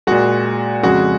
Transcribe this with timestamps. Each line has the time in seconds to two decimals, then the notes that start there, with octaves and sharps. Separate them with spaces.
0.07 A#2 G#3 F#4
0.83 F2 C#3 G#3 F#4